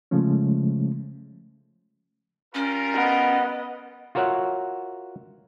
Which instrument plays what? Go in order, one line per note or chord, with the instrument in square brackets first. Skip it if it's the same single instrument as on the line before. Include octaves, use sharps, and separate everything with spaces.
[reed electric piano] C#3 F3 G#3 A3 C#4
[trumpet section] G3 F4 A#4 [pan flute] C#4
[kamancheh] B3 D#5
[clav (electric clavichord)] F4 F#4 A#4 C#5 E5 F#5